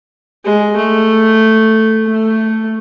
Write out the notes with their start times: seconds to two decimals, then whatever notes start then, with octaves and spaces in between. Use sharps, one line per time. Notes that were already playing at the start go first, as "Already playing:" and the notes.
0.45 G#3
0.77 A3
2.07 A3